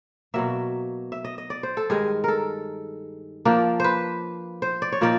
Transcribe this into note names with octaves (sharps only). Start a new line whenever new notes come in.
B2 F#3 A#3 E5
E5
D#5
D#5
D5
C5
A4
G2 D#3 G#3 G#4
A4 A#4
F3 A#3 D4
B4 C5
C5
D5
C#5
A#2 F3 A#3 D#4 D5